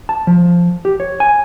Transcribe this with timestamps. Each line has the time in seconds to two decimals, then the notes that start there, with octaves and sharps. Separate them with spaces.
0.09 A5
0.27 F3
0.85 G4
1.00 C#5
1.20 G#5